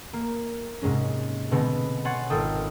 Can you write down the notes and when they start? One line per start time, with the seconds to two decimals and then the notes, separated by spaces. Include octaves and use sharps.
0.13 A#3
0.82 G#2 C3 G#3 C#4
1.51 B2 D3 G#3 B3 C4
2.05 C#5 F#5 G#5 C6 A6
2.30 G#1 F4 A4 G5 D#6